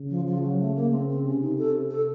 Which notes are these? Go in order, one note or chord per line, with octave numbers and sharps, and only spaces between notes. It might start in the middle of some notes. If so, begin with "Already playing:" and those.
Already playing: C#3
F3
F3
F#3
A3
A#3
C4
C4
C3 C#4
D#4
A4
A4